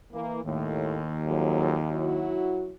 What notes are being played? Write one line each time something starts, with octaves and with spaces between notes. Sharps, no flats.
E3 A#3
D#2 A2
F2 F#3
F#3 E4 F#4